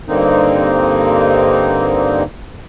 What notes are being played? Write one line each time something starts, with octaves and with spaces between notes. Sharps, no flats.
G2 D3 A#3 C4 D#4